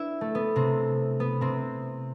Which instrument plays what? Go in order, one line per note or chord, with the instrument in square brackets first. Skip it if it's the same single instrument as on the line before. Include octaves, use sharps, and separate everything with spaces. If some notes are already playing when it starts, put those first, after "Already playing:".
Already playing: [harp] D4 E4 B4 E5
A3
B3
C3 C4
B3
C3 C4